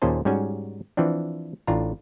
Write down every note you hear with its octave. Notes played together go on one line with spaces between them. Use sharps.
D#2 A#2 C#4 G#4 C5 A5
G#2 G3 C#4 F#4 G#5
E3 F3 C4 D4
A1 A2 D4 F4 A#5